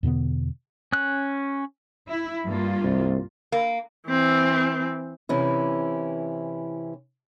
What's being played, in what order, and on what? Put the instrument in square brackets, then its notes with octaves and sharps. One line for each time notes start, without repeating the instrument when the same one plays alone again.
[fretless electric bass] E2 B2 D3 B3
[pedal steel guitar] C#4 F#6
[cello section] E4
G2 A#3 F4
[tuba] C2
[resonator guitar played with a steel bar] A#3
[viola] E3 C4
[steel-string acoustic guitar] C3 E3 C#4 E4